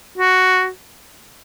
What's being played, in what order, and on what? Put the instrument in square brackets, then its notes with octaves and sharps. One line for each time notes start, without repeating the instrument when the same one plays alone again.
[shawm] F#4